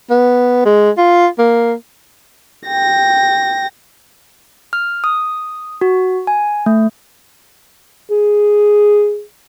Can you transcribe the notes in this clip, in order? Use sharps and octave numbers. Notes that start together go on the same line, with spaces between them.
B3
G#3
F4
A#3
G5 A#6
F6
D#6
F#4
G#5
A3
G#4